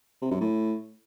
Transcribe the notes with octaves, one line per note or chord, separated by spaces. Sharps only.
C3
F#2
A2